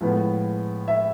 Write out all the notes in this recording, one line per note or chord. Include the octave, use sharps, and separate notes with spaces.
A2 F3 G#3 B3
E5